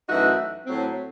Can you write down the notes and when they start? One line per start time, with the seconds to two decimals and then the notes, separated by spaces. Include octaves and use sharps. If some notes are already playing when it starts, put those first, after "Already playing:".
0.08 F#2 E3 A3 D#4 F#4
0.66 A2 F#3 C4